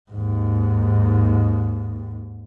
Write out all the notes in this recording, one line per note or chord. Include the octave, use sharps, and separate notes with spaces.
D#2 G#2